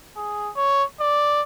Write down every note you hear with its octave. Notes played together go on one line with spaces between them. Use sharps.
G#4
C#5
D5